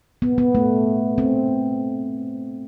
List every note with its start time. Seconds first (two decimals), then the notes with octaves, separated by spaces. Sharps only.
0.22 B3
0.38 B3
0.55 A3
1.18 C4